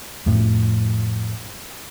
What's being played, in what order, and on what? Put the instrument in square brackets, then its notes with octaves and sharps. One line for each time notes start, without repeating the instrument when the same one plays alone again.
[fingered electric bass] F2 A2 F3